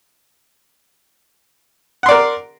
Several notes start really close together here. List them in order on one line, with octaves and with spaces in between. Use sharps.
F#5 C6 D5 A#4